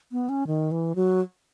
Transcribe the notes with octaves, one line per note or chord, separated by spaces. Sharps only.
B3
C#4
D#3
E3
F#3